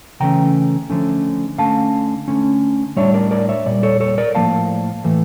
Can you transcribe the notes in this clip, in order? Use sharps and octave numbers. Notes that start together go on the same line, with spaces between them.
C#3 E3 A3 C#4 G5 A#5
D3 F3 A3 C#4
D3 A3 C#4 F5 A5
D3 A3 C#4
A2 G3 D4 C#5 E5
A#4 D5
A#4 D5
C#5 E5
A#2 G3 D5
A4 C#5
A4 C#5
A#4 D5
A2 F3 A#3 F5 A5
A2 E3 A3